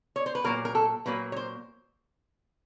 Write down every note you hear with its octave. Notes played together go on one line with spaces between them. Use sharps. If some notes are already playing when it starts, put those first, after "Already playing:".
C#5
C5
B4
A#2 F#3 A#3 A#4
A#4
A4
A#2 F#3 A#3 B4
C#5
C5